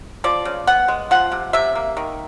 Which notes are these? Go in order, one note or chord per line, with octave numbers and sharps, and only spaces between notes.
F3 D5
C#3
B3 F#5
G#3
F3 F#5
C3
C3 E5
A#3
D#3